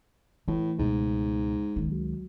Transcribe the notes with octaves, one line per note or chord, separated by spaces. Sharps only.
A2 E3 A3
C#2 G#2 B2
C#2 D#3
F#3